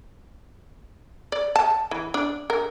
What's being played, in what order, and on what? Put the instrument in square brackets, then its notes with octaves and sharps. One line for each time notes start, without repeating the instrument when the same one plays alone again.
[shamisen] D5
A5
E3
D4
A#4